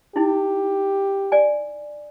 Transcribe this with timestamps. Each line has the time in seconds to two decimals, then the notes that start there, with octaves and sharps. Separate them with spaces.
0.16 D#4 E4 G4
1.32 D5 G#5